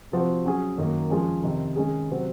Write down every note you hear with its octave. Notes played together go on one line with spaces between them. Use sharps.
C3 F3 C4 F#4 C5
F#3 C#4 G#4
F#2 D#3 A#3
F3 G#3 C#4
F2 C3 D#3
D#3 G#3 C#4 G#4
C3 F#3 C4